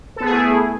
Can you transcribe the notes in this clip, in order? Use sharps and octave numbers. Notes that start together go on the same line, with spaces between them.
A3 B3 E4 G#4 A4